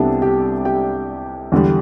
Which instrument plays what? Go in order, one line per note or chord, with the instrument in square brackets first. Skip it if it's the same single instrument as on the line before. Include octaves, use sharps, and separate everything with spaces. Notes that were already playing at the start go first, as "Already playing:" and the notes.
Already playing: [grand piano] C2 C3 G3 B3 D4 A4 A5
G4 G5
G4 G5
E2 D3 G3